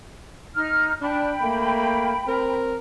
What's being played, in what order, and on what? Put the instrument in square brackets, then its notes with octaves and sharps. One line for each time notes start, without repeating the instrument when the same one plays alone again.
[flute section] D#4 F6
[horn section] D4 [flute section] G5 B5
[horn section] A3 A#3
C4 A#4